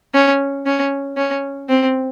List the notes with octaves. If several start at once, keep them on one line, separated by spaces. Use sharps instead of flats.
C#4
C#4
C#4
C4